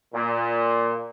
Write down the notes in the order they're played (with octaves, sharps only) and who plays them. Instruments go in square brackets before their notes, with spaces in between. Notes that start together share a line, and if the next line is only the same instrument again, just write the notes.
[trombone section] A#2